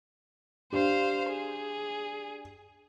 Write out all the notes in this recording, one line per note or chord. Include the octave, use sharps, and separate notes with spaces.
D4 G4 C5 F5
G#4